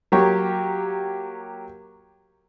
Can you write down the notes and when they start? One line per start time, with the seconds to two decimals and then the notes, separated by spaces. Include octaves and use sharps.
0.12 F#3 A#3 G4 C#5